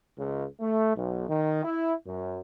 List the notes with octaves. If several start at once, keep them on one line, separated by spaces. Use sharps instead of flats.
C#2
A3
B1
D#3
E4
F#2